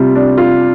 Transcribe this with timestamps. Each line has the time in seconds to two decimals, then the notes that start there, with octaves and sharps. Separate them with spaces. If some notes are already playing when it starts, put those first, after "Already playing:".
Already playing: C3 G3 F4
0.15 D4
0.38 F4